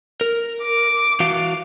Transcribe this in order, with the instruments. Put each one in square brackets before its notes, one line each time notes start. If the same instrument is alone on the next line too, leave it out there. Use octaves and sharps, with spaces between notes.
[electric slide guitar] A#4
[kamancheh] D6
[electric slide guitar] E3 F#4 F5